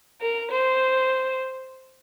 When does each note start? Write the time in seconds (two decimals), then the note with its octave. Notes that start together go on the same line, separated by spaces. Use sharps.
0.21 A#4
0.51 C5